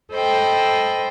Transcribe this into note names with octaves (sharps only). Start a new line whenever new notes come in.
A4 C5 D#5 G5 B5